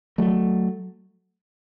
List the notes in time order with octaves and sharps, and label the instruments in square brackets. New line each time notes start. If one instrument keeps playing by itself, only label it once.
[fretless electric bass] F#3 A3